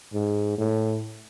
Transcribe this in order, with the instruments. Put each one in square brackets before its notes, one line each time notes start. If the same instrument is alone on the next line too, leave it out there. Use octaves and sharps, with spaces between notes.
[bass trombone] G#2
A2